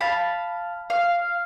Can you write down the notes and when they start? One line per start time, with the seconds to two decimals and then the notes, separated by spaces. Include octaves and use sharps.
0.01 F5 A5 B5
0.90 F5